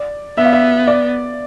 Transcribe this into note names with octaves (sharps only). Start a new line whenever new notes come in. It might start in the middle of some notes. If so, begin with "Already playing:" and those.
Already playing: D5
B3 E5
F5
E5
D5